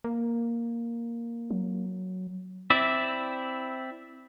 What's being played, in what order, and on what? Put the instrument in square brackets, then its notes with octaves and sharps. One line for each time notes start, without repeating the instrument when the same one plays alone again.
[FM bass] A#3
[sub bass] F#3
[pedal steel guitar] C4 E4 D5 E5